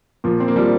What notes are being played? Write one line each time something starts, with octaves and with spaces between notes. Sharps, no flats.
A#2 F3
C4
A#3
F3 G3